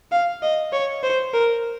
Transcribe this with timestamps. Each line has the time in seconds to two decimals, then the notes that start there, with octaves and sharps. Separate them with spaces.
0.12 F5
0.43 D#5
0.72 C#5
1.03 C5
1.33 A#4